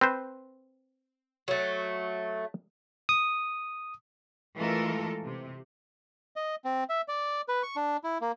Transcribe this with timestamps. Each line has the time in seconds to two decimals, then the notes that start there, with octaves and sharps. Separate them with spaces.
0.01 C4 B4 C5
1.48 F#3 A3
3.09 D#6
4.56 E3 G#3 A3 F4 A4 A#4
5.24 C3
6.36 D#5
6.65 C4
6.89 E5
7.08 D5
7.48 B4
7.63 C#6
7.76 D4
8.04 E4
8.21 A#3